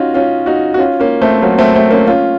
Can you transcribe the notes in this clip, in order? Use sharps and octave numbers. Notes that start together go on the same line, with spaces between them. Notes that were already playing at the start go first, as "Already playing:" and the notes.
Already playing: C#4 D#4 F4 F#4
C#4 F4
D#4 F#4
F#4
C#4 F4
A#3 C#4
A3 C4
F#3 A#3
A3 C4
A3 C4
A#3 C#4
C#4 F4